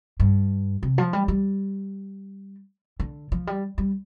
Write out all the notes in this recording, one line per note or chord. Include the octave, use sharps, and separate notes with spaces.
G2
C3
F3
G3
G3
D3
F3
G3
G3